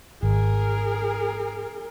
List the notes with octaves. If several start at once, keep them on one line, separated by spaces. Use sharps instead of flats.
G#1 G#4 A#4